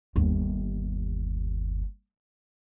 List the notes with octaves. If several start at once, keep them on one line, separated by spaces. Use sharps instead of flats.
G1 D#2